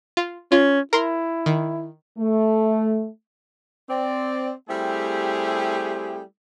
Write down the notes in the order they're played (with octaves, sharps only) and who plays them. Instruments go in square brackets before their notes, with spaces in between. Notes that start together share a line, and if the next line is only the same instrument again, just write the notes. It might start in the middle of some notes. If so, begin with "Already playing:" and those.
[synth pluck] F4
[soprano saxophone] C#4 [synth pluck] F4
[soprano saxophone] E4 [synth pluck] A#4 C6
[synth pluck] D#3
[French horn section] A3
[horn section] C4 D5
G3 A3 C4 E4 G4 G#4